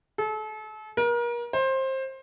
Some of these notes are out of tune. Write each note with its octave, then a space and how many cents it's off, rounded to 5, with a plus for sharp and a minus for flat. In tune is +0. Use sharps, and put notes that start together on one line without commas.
A4 -35
A#4 +35
C5 +20